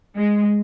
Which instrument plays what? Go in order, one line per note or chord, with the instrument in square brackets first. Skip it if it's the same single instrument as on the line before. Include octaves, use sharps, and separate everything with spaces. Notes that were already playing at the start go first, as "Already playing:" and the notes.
[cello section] G#3